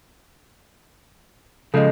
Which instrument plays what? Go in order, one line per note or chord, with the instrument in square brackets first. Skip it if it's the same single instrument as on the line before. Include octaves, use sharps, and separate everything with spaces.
[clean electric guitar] C#3 F3 G#3 [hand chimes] A4 D#5